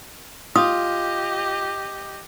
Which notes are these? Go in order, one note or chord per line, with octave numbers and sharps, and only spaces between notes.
F4 G4 D#5 D#6